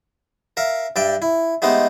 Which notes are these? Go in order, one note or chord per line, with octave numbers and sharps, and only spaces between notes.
A#4 E5 F5
G2 D5 E5 G5
E4
G#3 A3 B3 D#4 G4 C5